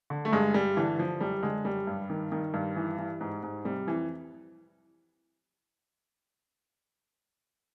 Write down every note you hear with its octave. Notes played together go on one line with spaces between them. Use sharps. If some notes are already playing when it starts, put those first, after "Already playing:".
D3
A3
G2 G#3
G2 G3
D3 E3
D3 F3
F#2 G3
D3 G#3
F#2 G3
G2
D#3
D#3
G2
E3
E3
G#2
G#2
C3 G3
F2 E3